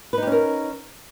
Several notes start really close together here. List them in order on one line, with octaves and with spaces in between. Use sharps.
B4 D#4 G4 C#4 A#4